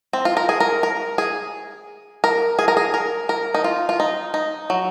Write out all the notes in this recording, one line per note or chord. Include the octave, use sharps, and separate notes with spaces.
C4
F4
A#4
G#4
A#4
A#4
G#4
A#4
G#4
A#4
G#4
A#4
A#4
D#4
F4
F4
D#4
D#4
F#3